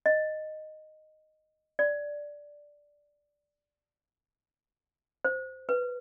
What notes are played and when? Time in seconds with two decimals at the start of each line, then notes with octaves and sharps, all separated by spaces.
0.06 D#5
1.79 D5
5.25 C5
5.69 B4